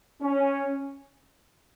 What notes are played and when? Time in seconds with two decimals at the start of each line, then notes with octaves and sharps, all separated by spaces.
0.20 C#4